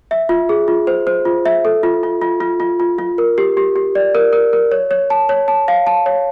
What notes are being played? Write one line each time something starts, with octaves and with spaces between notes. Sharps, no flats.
E5
F4
G#4
F4
C5
C5
F4
E5
A4
F4
F4
F4
F4
F4
F4
F4
A#4
G4
G4
G4
D5
A#4
A#4
A#4
C#5
C#5
A5
C#5
A5
F5
A5
C#5